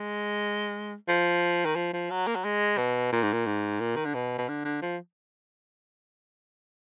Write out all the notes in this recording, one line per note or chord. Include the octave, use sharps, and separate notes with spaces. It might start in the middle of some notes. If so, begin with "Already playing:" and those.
Already playing: G#3
F3
D#3
F3
F3
F#3
A#3
F#3
G#3
B2
A#2
G#2
A#2
G#2
A#2
D#3
D3
B2
B2
D3
D3
F3